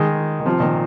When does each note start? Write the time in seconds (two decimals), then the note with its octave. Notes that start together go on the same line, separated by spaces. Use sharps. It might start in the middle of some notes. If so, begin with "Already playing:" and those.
Already playing: D#3 G#3
0.40 D#3
0.45 C3 F3
0.60 A#2 D#3